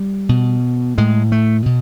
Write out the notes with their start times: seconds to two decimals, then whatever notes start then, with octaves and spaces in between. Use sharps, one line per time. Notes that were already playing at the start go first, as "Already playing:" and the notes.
Already playing: G3
0.29 B2
0.98 A2 G#3
1.32 A3
1.66 B2